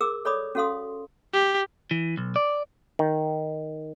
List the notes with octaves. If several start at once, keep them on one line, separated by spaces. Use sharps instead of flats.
G#4 A#4 D6 E6
A4 C#5 D5 B5 D6 D#6
C#4 F#4 A4 F5 C6 D#6
G4
E3
B1
D5
D#3